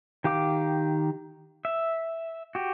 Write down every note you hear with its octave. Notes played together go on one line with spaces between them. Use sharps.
D#3 G4 F5 D6
E5
F#4 G4